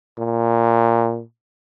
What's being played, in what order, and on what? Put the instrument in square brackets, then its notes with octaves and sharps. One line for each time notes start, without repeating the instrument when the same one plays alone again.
[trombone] A#2